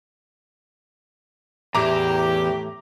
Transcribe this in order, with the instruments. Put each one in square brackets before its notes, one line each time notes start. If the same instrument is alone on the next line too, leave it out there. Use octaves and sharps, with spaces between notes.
[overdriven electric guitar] E2 [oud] A2 E3 [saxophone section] G4 [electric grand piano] A#5 D6